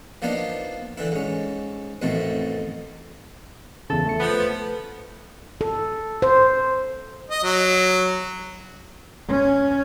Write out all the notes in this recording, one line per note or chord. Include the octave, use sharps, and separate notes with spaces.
F3 A#3 B3 D4 D#4
D3 E3 E4
G#2 C#4
A1 F2 B2 D#3 A3 C4
E2 C#3 A4
A3 C#7
F3 B3
A4
C5
D#5
F#3
C#4